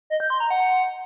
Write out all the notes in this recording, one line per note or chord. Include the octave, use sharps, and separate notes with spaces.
D#5
G6
C6
A#5
F#5